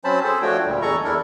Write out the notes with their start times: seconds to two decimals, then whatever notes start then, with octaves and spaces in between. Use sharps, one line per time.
0.04 F#3 C4 C#4 C5 A5 B5
0.24 G#4 A4 C5
0.42 F3 A3 D4 F#4 C#5 G5
0.66 D2 A#2 G3
0.82 E2 G#4 A4 D#5 A#5 C#6
1.04 E2 D4 E4 A4 A#4